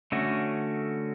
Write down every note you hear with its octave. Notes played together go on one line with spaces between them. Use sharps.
D3 A3 C#4 F#4